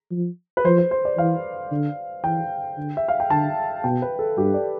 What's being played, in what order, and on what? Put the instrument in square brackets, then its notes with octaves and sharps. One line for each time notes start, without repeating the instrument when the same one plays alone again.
[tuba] F3
[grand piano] B4
[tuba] F3 [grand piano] C5
[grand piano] C5
C5
D5
[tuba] E3 [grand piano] F5
[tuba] D3
[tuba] E3 [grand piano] G5
[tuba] D3
[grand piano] E5
F5
G5
[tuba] D3 [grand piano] A5
[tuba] B2 [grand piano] G5
[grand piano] B4
A4
[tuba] G2 [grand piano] G4
[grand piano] D5